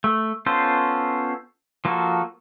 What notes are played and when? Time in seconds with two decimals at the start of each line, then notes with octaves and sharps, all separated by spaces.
0.04 A3
0.46 B3 C#4 F4 A4 C5
1.85 F3 A#3 F#4 A4